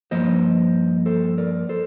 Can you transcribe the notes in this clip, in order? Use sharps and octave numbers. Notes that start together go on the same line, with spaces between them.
G2 F3 A#3 C5 D#5
A4 C5
A#4 D5
A4 C5